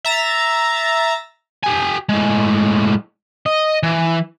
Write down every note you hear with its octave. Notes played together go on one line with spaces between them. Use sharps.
E5 A#5 A6
G4 G#5
A2 G#3
D#5
E3